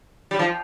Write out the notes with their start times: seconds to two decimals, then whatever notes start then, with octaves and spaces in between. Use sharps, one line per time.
0.31 G3
0.39 F3